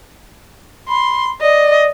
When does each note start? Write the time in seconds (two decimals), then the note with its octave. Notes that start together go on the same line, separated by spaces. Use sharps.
0.88 B5 C6
1.41 D5 D#5